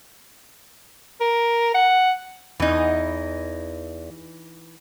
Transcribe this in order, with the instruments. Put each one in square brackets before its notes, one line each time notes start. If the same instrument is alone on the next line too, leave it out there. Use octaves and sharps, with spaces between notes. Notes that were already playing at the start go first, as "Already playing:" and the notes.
[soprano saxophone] A#4
F#5
[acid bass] E2 [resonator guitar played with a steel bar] E3 D#4